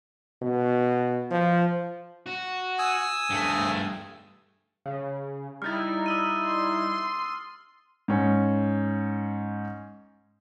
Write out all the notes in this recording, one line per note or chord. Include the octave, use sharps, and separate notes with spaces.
B2
F3
F#4
G#5 D#6 E6
G2 A3
C#3
G3 D#4 E4 F6 A6
D#6 E6 D#7
C6
G#2 C#4